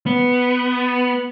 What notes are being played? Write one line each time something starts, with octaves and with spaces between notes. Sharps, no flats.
B3